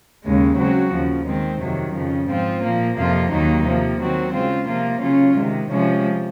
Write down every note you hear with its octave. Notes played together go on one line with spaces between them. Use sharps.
D#2 C#3 G#3
C#3 F#3 C4 F#4
D#2 C#3 F3
D#3 G#3 C4
F2 C3 D#3 F#3
F2 C#3 F3
G#2 F3 C4 F4
A#2 F3 A#3
F2 C3 F3 A#3 F4
D#2 D#3 F#3 A#3 D#4
C3 F3 A#3
D#3 F#3 C4 F#4
C#3 G#3 C4 F4
C3 F3 A#3 F4
C#3 F#3 C#4 F4
C3 D#3 G#3
C3 F3 G#3 C#4